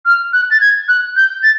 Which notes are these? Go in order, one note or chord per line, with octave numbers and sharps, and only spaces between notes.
F6
F#6
A6
G#6
F#6
G6
A6